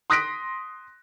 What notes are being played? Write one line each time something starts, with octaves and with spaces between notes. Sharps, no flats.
C6 D#6 F#6 A#6 B6 D7